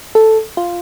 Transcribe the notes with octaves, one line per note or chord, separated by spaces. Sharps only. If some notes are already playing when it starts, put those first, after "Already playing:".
A4
F4